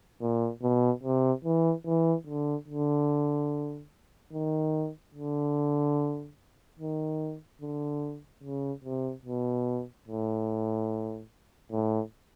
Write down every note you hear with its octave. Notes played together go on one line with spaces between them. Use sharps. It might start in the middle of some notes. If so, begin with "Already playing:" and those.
A#2
B2
C3
E3
E3
D3
D3
D#3
D3
D#3
D3
C#3
C3
B2
A2
A2